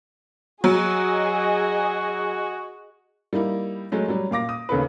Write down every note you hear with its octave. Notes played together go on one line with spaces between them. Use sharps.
F#3 F#4 G#4 D#5
G3 A#3 D#4 E4
F#3 G#3 A3
F#3 G3
A#2 F5 D6 A#6
D#6
D#2 C#3 A4 B4